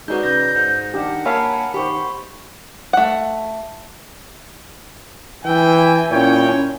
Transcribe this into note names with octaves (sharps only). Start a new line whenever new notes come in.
G#3 D#4 F#4 B4 D5 G6
C#3 G6 A#6
G#2
D#3 D4 G4 F#5
A#3 C#5 E5 F5 G#5 A5 B5
D#3 G4 C5 B5 C#6
A3 F#5
E3 E5 G5 G#5
A#2 C#4 E4 C#5 G5